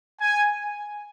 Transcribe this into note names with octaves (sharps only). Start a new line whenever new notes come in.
G#5